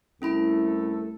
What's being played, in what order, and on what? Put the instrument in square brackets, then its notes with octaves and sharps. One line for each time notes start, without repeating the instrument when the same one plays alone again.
[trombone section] C2 A3 A4 [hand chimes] C#4 E4 B5